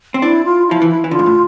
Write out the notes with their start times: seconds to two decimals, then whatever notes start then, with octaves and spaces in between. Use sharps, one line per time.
0.14 C4
0.22 D4 E4
0.45 F4
0.67 F3 E4
0.82 E3
0.89 E4
1.04 E3
1.11 D3 F4
1.19 G#2
1.26 A2